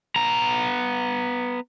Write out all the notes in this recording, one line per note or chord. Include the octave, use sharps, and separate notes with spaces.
B3 A#5